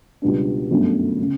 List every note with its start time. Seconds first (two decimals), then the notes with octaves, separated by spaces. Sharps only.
0.22 C#2 B2 G3 B3 D4
0.71 G1 F#2 D3 A3
1.21 C#3